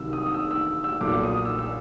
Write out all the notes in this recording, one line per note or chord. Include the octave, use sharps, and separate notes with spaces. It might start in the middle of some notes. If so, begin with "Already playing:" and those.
Already playing: C2 C3 D#3 F#3 E6
D#6
D#6
E6
E6
E6
B1 A#2 F#3 D6
D#6
E6
E6